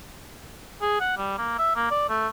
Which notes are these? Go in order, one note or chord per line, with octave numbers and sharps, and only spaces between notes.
G#4
F#5
G3
A#3
E5
A#3
D5
A3